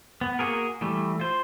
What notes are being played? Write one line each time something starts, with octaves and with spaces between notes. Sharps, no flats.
B3
A#3 F#4 G#4 A#4
E3 G3 A3
F4 C5